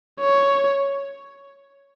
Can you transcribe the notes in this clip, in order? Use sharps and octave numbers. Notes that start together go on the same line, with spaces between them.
C#5